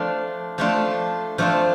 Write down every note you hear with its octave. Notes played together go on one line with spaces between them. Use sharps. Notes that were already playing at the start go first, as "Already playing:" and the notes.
Already playing: F3 A3 D4 F4
F3 A3 D4 F4
F3 A3 D4 F4